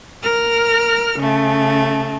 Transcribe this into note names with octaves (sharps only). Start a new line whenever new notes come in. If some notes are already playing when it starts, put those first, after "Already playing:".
A#4 F6
C#3 A3